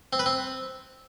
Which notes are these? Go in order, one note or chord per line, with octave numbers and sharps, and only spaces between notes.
C4
B4
C4